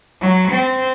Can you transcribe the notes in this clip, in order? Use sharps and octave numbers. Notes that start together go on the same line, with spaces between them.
F#3
C4